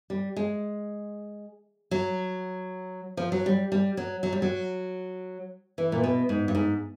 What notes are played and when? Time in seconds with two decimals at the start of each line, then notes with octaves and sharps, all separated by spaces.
0.10 G3
0.37 G#3
1.91 F#3
3.17 F3
3.32 F#3
3.46 G3
3.72 G3
3.97 F#3
4.23 F#3
4.32 G3
4.42 F#3
5.78 E3
5.92 A#2
6.04 B2
6.29 G#2
6.48 G2
6.55 G#2